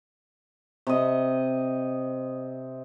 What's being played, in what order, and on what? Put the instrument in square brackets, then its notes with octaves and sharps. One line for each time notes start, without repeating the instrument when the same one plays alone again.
[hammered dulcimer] C3 D#5